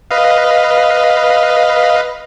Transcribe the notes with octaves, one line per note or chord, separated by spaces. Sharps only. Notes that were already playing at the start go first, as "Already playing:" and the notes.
B4 D#5 F5